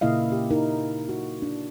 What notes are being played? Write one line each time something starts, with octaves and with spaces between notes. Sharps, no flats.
A#2 C#3 A#3 E4 D#5 F5
G4
D#4 E4 A#4
F#4
D4